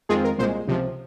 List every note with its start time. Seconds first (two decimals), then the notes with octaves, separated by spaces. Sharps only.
0.09 F2 D#3 G#3 C4 F4 G#4
0.24 A#4
0.38 C2 A#2 G#3 C5
0.67 C#2 C3 F3